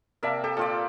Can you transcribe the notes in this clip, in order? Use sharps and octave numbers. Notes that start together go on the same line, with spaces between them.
C3 A#3 A#4 D5 E5 A5
G4 A4
A#2 F4 A4 D5